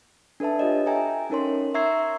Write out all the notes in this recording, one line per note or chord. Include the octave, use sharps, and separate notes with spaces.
D4 A4 B4 E5 A5
F4 G4 C#5 D#5
A4 E5 G5 G#5 A#5
C#4 D#4 A#4 C#5 C6
E5 A#5 C#6 E6 G#6 C7